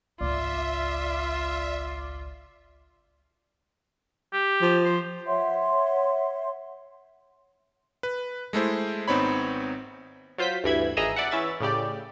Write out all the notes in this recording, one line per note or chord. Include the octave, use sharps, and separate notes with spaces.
G#1 C#2 F4 D5 E5
G4
F3
C5
C#5 E5 F#5 C6
B4
G#3 A3 E4 C5
G#1 B3 C4 D#4 C#5 B5
F#3 F4 C5 G6 B6
D2 G2 E3 E4 B5 G#6
G#1 E3 G#4 D#5 A#5 E6
D5 E5 F#5
E3 C#4 E5 A6
A2 C#3 G4 D5